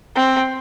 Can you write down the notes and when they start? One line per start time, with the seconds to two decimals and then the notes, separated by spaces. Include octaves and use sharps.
0.16 C4